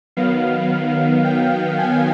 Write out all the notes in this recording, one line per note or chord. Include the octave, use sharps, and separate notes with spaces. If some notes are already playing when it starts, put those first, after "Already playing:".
D#3 F#3 B3 F5
G5
G#5